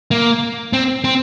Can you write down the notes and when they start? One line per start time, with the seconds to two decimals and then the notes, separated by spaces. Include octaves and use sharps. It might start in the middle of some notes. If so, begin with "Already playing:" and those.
0.11 A#3
0.73 C4
1.04 C4